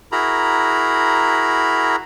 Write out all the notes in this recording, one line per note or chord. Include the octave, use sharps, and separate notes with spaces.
E4 F#4 G#4 A#4 A#5 B5